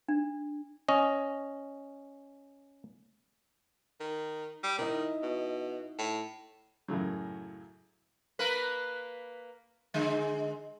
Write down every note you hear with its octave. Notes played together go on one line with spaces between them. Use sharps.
D4
C#4 D#5
D#3
G3
D#3 D#4 E4 D#5
B2
A2
F#2 A2 C#3 F#3
A#3 A#4 B4
D3 G#3